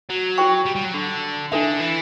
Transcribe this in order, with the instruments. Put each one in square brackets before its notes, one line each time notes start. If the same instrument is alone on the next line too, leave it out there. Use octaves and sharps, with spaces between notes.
[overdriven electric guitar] F#3
[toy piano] F#4 C#5 G5 C#6
[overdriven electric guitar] G3
G3
F#3
D3
[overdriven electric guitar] D3 [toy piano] D4 A4 E5
[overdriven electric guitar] E3